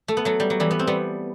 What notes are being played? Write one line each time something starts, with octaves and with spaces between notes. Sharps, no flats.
A3
B3
F#3 A3
G3
F#3
E3 G3
B3
C4
G3 B3